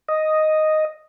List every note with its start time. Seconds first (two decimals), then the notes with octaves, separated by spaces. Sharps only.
0.08 D#5